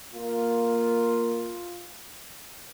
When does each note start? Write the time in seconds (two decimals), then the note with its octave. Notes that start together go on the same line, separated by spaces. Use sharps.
0.14 A#3 F4